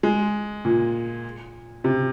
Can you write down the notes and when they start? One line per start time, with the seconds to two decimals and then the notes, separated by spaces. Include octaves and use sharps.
0.03 G#3
0.65 A#2
1.84 C3